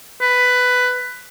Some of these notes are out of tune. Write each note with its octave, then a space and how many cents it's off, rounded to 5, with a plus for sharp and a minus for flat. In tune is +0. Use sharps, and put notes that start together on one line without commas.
B4 +10